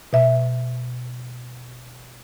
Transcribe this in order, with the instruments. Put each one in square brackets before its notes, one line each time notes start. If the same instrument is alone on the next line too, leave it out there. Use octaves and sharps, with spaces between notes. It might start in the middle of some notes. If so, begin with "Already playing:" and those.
[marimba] B2 E5